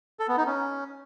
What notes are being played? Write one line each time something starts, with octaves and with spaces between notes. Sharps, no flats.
A4
B3
D#4
C#4